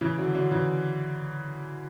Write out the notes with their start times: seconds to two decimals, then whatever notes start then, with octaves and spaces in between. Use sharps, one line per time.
0.01 C#3 E3
0.18 D3 F#3
0.35 D3 F#3
0.51 C#3 E3